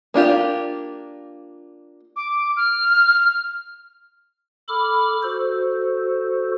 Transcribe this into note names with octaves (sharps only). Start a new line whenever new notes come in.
A#3 D4 F4 G4
D6
F6
A4 B5 D6 F6
F#4 A4 C5